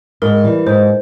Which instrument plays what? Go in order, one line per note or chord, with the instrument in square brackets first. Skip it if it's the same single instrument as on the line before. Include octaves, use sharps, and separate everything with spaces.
[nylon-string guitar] G#2 [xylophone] A#4
[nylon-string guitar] E3 G3
[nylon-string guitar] G#2 [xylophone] C5